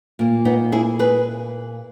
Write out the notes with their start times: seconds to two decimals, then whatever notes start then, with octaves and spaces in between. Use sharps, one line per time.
0.19 A#2 A#3
0.45 B3 D#4
0.72 E4 G#4
0.99 G#4 B4